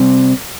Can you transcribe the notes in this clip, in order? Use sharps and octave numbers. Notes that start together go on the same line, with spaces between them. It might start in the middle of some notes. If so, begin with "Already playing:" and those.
Already playing: C3 G3 C4